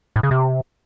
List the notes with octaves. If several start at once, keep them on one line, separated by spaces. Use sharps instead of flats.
A2
C#3
C3